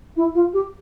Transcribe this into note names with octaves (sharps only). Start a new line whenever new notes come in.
E4
F4
G4